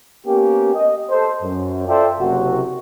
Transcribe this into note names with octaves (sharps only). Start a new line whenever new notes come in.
A#3 B3 C#4 G4
D#5
A4 C5
F#2
F4 A4 C5 D5 E5 G5
F#1 C3 F#4